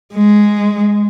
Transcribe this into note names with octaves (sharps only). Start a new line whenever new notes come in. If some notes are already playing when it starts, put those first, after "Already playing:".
G#3